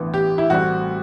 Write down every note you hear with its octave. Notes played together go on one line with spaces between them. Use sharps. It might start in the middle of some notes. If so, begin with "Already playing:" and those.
Already playing: A1 G2 E3 B3
G4
E4
A1 A2 G3 C4 F#4